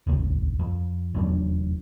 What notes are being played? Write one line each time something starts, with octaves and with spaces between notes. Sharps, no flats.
D#1 G#1 C#2
F2
F1 E2 F#3 D4